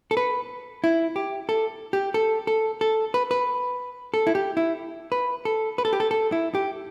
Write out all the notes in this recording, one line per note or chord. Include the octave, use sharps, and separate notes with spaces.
A4
B4
E4
G4
A4
G4
A4
A4
A4
B4
B4
A4
E4
G4
E4
B4
A4
B4
A4
G4
A4
A4
E4
G4